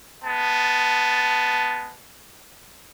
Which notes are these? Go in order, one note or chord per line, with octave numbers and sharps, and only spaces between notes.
G#3 B3 A5